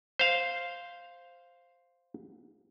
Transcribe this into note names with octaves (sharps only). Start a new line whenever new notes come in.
C5 F5